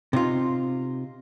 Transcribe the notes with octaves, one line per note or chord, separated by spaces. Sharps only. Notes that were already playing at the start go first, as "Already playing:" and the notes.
C3 D#4 F4